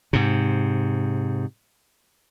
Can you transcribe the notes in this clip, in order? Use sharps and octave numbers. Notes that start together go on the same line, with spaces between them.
G#2 C3